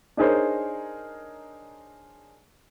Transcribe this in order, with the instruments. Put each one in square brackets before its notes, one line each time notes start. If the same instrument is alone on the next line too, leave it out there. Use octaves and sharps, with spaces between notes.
[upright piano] D4 D#4 G#4 A#4 C5 C#5